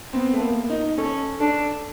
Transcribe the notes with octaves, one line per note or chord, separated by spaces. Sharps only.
B3 C4
A3
A#3
D#4
C#4 A4
D4 A4